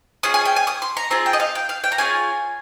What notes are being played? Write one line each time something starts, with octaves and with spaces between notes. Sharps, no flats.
C#4 F4 G#4 D#6
G#5
G5
G#5
D#6
C6
A#5
C4 F4 G#4 A#5
G5
D#5
F5
G5
F5
G5
A#5
C#4 F4 G#4 G#5